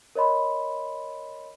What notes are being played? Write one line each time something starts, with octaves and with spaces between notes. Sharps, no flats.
A#4 C#5 D#5 B5 C6